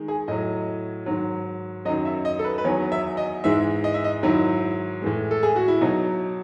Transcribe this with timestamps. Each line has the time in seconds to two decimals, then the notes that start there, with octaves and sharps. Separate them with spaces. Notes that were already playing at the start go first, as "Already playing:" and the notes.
Already playing: D#3 G#3
0.08 G#4
0.28 A2 F#3 D#5
1.06 G#2 D#3 F#3
1.85 F#3 D#5
1.88 F#2 D#3
2.05 E5
2.25 D#5
2.39 A4
2.44 B4
2.58 B4
2.64 E2 D#3 F#3 C#5
2.92 E5
3.17 D#5
3.44 G#2 E3 G#3 E5
3.84 D#5
3.94 E5
4.04 D#5
4.23 G#2 D#3 F#3 E4
5.02 A2 E3 G#3
5.31 A4
5.43 G#4
5.56 F#4
5.68 E4
5.81 B2 F#3 D#4